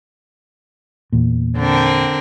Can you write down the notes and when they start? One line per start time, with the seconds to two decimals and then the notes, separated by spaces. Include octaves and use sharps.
1.12 E2 A#2
1.57 D3 C4 A#4